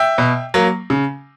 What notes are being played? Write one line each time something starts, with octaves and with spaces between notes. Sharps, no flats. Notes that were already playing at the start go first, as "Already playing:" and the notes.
Already playing: E5 G5
B2
F#3 A#3
C#3